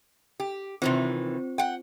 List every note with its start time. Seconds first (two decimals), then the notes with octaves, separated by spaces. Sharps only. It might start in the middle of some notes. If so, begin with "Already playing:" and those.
0.40 G4
0.82 C3 D#3 E3 C4 F4 C5
1.58 F#5 G5